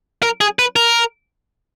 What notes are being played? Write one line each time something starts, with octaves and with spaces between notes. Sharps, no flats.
A#4
G#4
B4
A#4